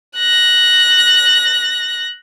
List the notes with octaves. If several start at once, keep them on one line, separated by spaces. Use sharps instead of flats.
F#6 A#6